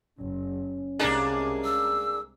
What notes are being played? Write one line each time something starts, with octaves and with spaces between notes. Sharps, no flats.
F#1 C#4
C2 C3 G#3 A#3 D4 G#4
E6